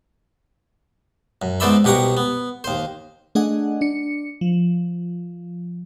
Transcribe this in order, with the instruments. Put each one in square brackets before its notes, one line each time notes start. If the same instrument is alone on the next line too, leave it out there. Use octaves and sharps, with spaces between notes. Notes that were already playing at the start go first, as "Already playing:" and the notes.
[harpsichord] F#2
G#2 B3 C5 D5 E5 B5
C2 B2 G4 F#5 A#5 C#6
B3
D#2 C5
[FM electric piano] A3 D4 G#4 D#5 F#5
D4 C#7
F3